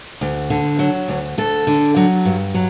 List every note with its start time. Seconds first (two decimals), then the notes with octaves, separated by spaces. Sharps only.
0.21 D2
0.50 D3
0.79 F#3
1.09 D2
1.38 D2 A4
1.67 D3
1.96 F#3
2.25 G2
2.54 F#3